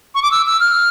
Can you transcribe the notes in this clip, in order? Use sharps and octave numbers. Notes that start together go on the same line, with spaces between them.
C#6
D6
E6
E6
F6